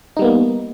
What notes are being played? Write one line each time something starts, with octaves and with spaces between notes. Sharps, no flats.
G3 A#3 B3 D#4